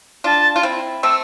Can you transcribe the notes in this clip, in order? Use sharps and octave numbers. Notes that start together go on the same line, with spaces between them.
D4 F4 A5
F4
C4 E4
A3 C4 E6